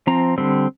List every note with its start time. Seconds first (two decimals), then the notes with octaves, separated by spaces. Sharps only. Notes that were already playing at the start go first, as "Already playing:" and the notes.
0.07 F3 C4 A#5
0.38 D3 G3 C4